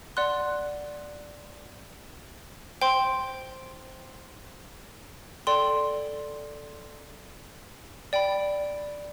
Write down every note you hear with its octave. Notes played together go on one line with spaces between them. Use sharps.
D5 F#5 C6 F#6
C5 G5 C6
A4 D5 G5 C6
D5 G5 B5